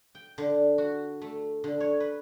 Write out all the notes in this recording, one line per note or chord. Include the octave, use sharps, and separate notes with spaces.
G5
D3
F#4
A3
D3
C#5
B4